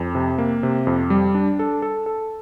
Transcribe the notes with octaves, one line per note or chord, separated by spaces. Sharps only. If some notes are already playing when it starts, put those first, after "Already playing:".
Already playing: F2
C3
A#3
C3
F2
G3
D4
A4
A4
A4